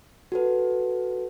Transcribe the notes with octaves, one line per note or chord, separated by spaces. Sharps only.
F#4 A4 B4